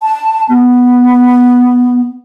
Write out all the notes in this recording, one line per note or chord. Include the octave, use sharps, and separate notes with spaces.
A5
B3